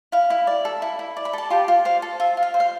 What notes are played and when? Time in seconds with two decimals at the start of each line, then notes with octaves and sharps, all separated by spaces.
0.12 E4 F5
0.30 E4
0.47 D5
0.65 A4
0.82 E4
0.99 E4
1.17 D5
1.25 B5
1.33 A4 A5
1.50 F4 G4 G5
1.68 F4
1.85 C5 F5
2.02 A4
2.20 F4 E5
2.37 F4
2.43 F5
2.54 C5
2.60 F5